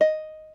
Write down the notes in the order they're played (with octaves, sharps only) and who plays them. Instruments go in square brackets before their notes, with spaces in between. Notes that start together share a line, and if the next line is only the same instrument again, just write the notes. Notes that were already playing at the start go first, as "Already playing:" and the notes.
[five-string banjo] D#5